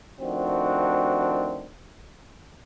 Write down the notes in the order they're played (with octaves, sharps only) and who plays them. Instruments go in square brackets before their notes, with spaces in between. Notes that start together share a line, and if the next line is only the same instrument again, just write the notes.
[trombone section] D#3 F3 A3 C4 D4 F#4